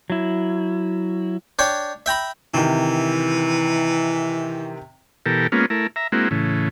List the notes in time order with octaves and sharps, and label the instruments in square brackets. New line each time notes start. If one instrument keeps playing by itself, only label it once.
[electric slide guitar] F#3 E4
[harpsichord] D4 C#5 G5
E5 G5 A#5 B5
[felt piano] C3 D#3 [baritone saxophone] E3
[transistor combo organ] B2 E3 G4 A4 A#4
G#3 A#3 B3 C#4 F4
A3 E4 A#4
E5 A#5
G#3 A#3 C4 E4 F#4
A2 C#3 E3